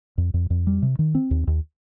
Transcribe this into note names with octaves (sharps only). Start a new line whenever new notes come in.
F2
F2
F2
G3
C3
D#3
C4
D#2
D#2